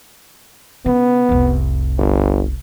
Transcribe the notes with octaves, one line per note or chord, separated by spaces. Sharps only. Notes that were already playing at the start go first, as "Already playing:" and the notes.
C#3 B3
F1 C2
G1